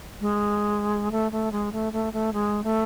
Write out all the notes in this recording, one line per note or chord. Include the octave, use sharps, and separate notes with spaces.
G#3
A3
A3
G#3
A3
A3
A3
G#3
A3